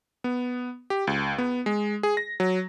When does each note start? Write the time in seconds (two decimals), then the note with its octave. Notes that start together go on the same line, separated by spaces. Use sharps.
0.24 B3
0.90 G4
1.07 C#2
1.38 B3
1.66 G#3
2.03 G#4
2.17 A#6
2.40 F#3